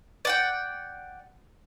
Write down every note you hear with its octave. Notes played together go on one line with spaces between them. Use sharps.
D5 F#5 G5